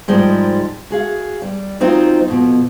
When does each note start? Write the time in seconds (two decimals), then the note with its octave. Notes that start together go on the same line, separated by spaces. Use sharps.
0.08 G#2 D#3 F3 G3 G#3
0.90 F#4 G#4 F5
1.42 G3
1.80 D#3 F#3 C4 D#4 F4 C5
2.28 F2 B2